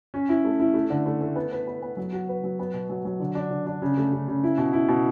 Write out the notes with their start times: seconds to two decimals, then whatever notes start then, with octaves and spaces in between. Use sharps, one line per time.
0.14 C#4
0.29 E4
0.45 A3
0.60 E4
0.74 A3
0.90 D3
1.06 A3
1.21 A3
1.36 B3
1.52 B4
1.67 B3
1.82 B3
1.97 F#3
2.13 F#4
2.29 B4
2.44 F#3
2.59 B3
2.73 B2
2.90 F#3
3.05 F#3
3.20 D3
3.35 D4
3.51 D3
3.66 D4
3.82 C#3
3.97 A3
4.12 C#3
4.28 C#3
4.43 E4
4.58 B2
4.73 E4
4.88 B2